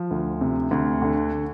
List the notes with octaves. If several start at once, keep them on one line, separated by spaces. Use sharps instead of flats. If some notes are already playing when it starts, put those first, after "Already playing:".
Already playing: F3
D2
C3
D2
D3